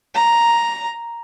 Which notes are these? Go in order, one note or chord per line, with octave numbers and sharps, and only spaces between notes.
A#5